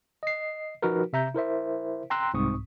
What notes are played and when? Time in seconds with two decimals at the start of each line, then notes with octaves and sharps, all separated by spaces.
0.23 D#5 C7
0.82 F3 D#4 F#4 A#4 B4
1.13 C3 E5 A#5 G6
1.34 E4 A#4 C5 E5
2.10 G5 A#5 C6 E6 F#6
2.34 C2 G#2 C4 C#6 D#6